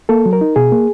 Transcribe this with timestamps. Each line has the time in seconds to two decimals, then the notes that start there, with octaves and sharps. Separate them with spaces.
0.09 A#3 A4
0.26 F#3
0.33 A#4
0.41 D#4
0.56 B2 G#4
0.72 A#3